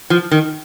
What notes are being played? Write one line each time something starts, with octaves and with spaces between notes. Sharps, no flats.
F3
D#3